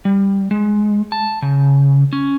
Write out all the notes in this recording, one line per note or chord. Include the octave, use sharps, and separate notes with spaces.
G3
G#3
A5
C#3
C#4